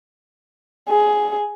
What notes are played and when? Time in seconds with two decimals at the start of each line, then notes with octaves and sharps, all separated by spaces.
0.89 G#4